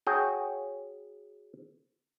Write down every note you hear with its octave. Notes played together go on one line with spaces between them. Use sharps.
F#4 G#4 C#5 G5